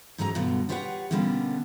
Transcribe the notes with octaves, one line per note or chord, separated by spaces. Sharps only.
G#2 F#3 A3 C#4 G#4 A#5
G2 B2 D3 F#3
F4 G4 B4 C#5 E5 F#5
B2 D3 G3 A#3 B3 C#4